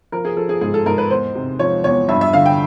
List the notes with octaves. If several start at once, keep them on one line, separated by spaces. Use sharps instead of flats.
F3 A#4
G#4
F3 A4
G#4
G#2 G#4
A4
G#2 A#4
B4
E2 C5
C3
F3 C#5
E2 C#5
G2 E5
E5
D3 F5
G5